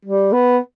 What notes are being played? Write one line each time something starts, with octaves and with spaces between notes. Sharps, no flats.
G3
B3